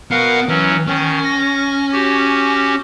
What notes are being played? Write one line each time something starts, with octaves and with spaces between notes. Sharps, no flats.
B3 F#4 A#4 F5 F#5
E3 F#3 C#4
D#3 C#4
A#6
F#4 G4